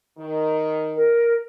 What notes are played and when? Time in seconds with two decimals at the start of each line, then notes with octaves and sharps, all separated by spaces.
0.18 D#3
0.96 A#4